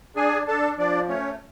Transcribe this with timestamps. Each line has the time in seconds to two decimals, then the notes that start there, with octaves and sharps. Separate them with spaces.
0.16 D4 G#4 G#5
0.47 D4 A4 A5
0.78 F3 D4 D5
1.08 A3 C#4 C#5